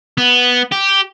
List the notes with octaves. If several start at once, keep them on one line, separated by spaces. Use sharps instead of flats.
B3
G4